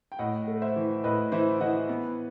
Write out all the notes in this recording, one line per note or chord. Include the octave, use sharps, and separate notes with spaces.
G5
A2 D#5 F#5
A3
C5 E5
E3
A2 B4 D#5
E3 C5 E5
E3 D#5 F#5
B3